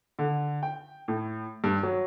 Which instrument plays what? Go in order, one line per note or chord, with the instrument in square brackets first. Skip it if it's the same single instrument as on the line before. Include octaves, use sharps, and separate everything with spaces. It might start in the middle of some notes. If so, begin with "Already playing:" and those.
[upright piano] D3
G5
A2
G2
F#3